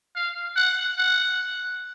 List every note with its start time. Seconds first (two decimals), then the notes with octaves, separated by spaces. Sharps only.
0.15 F5
0.56 F#5
0.98 F#5